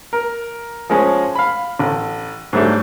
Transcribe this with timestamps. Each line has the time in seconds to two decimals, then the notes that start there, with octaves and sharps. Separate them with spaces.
0.13 A#4
0.90 F3 G#3 C#4
1.35 F5 B5
1.79 A1
2.53 G#2 F#3 G3 A3 D4